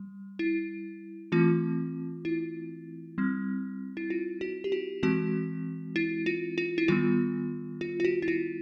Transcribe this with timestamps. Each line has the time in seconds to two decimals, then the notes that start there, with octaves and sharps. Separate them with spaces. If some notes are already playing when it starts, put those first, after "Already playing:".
Already playing: G3
0.39 E4
1.32 E3 A3 C4 F4
2.25 E4
3.18 G3 C4
3.97 E4
4.10 F4
4.41 F#4
4.64 G4
4.72 F#4
5.03 E3 G#3 C4 F#4
5.96 E4
6.26 F4
6.58 F4
6.78 E4
6.88 D#3 G3 B3 F4
7.81 F4
8.00 F4
8.05 F#4
8.22 E4
8.28 F4